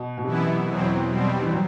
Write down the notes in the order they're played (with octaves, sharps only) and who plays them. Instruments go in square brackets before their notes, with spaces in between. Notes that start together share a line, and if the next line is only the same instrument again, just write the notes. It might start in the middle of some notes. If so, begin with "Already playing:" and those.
Already playing: [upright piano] B2
B2
[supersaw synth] F#2 E3 B3 E4 [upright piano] C3
[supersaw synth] E2 B2 F#3 C4
B2 G3 C4
[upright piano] E3
F#3